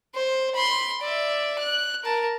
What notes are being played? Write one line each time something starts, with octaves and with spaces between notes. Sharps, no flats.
C5
B5 C6
D5 E5
F#6
A#4 A5